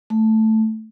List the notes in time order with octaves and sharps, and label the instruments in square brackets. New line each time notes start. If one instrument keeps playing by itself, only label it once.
[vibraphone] A3